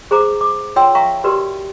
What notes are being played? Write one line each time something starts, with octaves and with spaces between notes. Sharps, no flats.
G#4 C5 A#5 D6
D6
F4 C#5 F#5 G5 C6 E6
E5 F5 G5 A#5 C#6
F#4 G4 A#4 B4 D5 C6